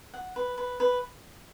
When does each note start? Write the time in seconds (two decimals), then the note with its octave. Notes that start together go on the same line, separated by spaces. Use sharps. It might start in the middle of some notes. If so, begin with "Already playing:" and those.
0.14 F#5
0.36 B4
0.58 B4
0.80 B4